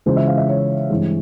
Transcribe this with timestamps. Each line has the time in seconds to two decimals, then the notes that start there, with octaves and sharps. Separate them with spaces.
0.06 C#3 E3 G#3 C#4 F4 C5
0.17 E5
0.28 F5
0.37 E5
0.48 C#5
0.90 G2 E3 G#3 C4